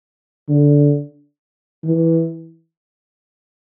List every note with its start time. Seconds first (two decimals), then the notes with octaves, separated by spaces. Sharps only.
0.49 D3
1.84 E3